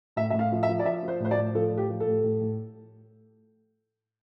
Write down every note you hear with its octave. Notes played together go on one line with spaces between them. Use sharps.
A2 E5
A2 E5
F5
F3
E5
F3
D5
F3 E5
F3
C5
A2 C5
D5
A2
F3 A4
A2
G4
F3
A4
A2
A2
A2